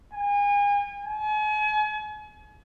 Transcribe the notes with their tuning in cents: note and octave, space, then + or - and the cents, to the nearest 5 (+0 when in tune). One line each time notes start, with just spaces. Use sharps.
G#5 -35
G#5 +40